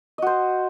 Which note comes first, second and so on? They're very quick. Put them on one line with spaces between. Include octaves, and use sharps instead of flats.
D#5 F#4 C5